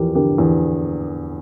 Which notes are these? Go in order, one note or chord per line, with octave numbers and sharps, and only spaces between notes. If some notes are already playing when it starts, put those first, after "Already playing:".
Already playing: E2 F3 G4 A#4
D3 G4 A#4
E2